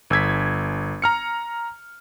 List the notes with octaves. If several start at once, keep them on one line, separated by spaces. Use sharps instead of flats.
G1 E6 G#6 B6
A#5 F6 C#7